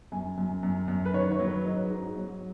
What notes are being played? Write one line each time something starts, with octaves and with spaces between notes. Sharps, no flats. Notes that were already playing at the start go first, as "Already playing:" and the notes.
F#2 G#5
F#2
F#2
F#2
B4
D#3 C#5
C#5
F#3
B4
G#2 D#5
G#2
F#3